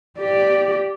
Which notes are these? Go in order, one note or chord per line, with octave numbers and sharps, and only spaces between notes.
G4 D5